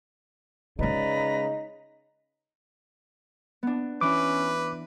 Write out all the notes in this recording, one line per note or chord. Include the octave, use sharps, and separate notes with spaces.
C#3 G#3 D#4 F4 B4 D5 A#5
B3 D4
E3 C#4 B4 D6